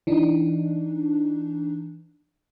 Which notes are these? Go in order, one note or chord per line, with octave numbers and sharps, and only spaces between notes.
E3 D4 D#4